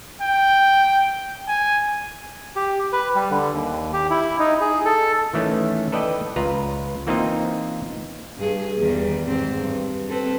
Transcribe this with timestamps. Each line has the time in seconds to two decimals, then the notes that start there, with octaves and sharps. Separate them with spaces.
0.22 G5
1.48 G#5
2.56 G4
2.93 B4
3.15 G3
3.31 D3
3.53 D#2
3.93 G4
4.11 E4
4.39 D#4
4.61 G#4
4.85 A4
5.33 D#3 E3 A3 C#4
5.92 A4 B4 D5 D#5 G5
6.36 C#2 F4 B4 A#5
7.07 E3 A#3 C4 D#4 F4 D#5
8.38 G2 G#4
8.78 E2 D#3 G3
9.25 G#2 C4
9.60 G2
10.08 C4 A4 B4